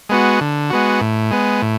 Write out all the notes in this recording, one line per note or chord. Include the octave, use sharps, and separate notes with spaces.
G#3 B3 F#4
D3
G#3 B3 F#4
A2
G#3 B3
A2